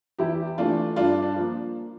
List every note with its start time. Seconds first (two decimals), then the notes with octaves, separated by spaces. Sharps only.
0.19 E2 E4 G4
0.58 E3 A3 D4 F4
0.96 G2 D4 F4
1.22 D4
1.36 F3 A#3